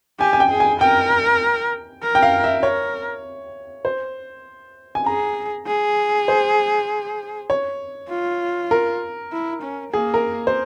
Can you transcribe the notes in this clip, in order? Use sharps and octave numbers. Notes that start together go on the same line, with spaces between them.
G4 G#5
G#5
G5
G#4
G#5
A#4 G5
A#4
G5
F5
E5
A#4 C#5
C5
G#5
G#4 A#5
G#4
C5
C#5
F4
A#4
E4
C#4
A#3 G#4
A#4
C5